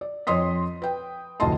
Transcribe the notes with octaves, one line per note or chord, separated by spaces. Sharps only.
D5
F2 C#5 D#5 C6 D#6 B6
B4 G5
F1 D2 A2 D#5 A5 C6